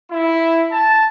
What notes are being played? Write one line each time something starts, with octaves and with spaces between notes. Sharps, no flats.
E4
A5